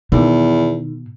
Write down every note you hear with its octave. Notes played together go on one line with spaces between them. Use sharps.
E2 B2 D#3